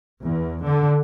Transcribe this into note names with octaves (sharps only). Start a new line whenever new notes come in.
E2
D3